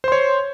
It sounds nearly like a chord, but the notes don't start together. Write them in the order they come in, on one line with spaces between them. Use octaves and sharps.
C5 C6 C#5